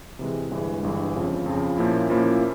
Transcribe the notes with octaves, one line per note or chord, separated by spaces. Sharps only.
C3 E3 G#3
G1 G2 E3 G#3
G1 G2 E3 G#3
F2 C#3 F3
F2 C#3 F3
A#2 F3 A#3 C#4 E4
A#2 F3 A#3 C#4 E4